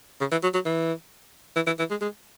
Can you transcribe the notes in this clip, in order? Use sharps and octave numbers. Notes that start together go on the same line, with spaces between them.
C#3
E3
F#3
F#3
E3
E3
E3
E3
G#3
G#3